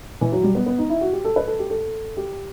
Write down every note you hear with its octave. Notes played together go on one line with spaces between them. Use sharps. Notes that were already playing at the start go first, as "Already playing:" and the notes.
E3
F#3
G3
B3
B3
D#4
E4
F#4
G4
A4
B4
A4
G4
A4
G4